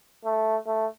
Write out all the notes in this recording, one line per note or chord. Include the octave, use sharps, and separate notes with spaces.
A3
A3